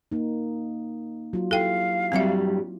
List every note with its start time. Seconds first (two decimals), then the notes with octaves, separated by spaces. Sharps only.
0.12 A#3 D#4
1.33 F#3 F4
1.51 E4 G4 A4 F5 G5
2.12 G2 F#3 G3 C4 E5